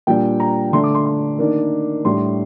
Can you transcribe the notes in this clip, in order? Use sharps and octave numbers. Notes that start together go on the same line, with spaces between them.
A#2 G3 D4 G5
A#5
D3 A3 D4 C6
D6
C6
C6
D#3 A#3 D4
A2 G3 D4 C6